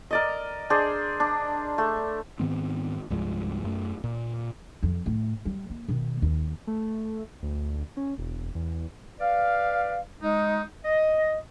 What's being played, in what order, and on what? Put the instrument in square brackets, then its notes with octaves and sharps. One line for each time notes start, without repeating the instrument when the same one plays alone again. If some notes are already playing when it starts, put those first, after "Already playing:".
[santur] A#4 D5 D#5
D4 G#4 C5 D5
D4
A3
[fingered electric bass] G#2 D#3 B3 C4
C2 G2 F3 G#3
F#2 A3
A#2
[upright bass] F2
A2
G3
A#3
B2 D#3
D#2
[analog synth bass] A3
D2
C#4
E1
E2
[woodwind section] B4 D5 F5
G#3 D#4
D#5